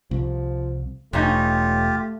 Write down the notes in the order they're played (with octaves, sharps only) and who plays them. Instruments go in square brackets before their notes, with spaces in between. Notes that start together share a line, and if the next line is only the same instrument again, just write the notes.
[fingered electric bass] C2 [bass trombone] F3
[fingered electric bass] E1 [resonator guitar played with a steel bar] G2 C#4 D#4 [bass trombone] A3 [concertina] F4 G4